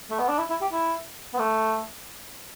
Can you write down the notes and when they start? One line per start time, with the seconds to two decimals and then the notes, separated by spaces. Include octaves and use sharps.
0.11 A3
0.20 B3
0.29 D4
0.39 E4
0.50 E4
0.62 G4
0.73 E4
1.34 B3
1.39 A3